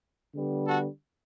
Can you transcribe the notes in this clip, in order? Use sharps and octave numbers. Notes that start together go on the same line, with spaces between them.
D3 G3 B3
F#4 A4